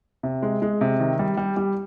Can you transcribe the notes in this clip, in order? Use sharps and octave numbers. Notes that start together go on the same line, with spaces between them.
C3
G#3
G#3
C3
D#3
G3
G3
G3